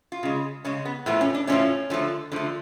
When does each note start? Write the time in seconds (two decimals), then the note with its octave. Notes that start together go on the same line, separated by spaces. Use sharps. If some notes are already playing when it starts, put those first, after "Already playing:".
0.12 F4
0.23 C#3 G#3
0.65 C#3 G#3 C#4
0.85 B3
1.06 A2 F3 A3 B3
1.21 C#4
1.35 D4
1.47 A2 F3 A3 C#4
1.90 D3 F3 A3
2.32 D3 F3 A3